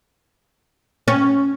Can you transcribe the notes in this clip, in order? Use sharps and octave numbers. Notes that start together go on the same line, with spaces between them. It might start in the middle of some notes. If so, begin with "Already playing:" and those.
C#4